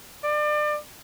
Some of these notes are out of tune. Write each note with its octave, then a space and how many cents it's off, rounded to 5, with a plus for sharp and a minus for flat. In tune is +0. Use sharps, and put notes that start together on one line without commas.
D5 +35